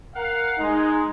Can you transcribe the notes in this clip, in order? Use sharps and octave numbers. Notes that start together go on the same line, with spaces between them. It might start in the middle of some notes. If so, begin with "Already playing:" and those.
A#4 F5 F#5
G#3 D#4